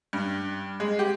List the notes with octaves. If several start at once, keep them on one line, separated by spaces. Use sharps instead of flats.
G2
G#3
G4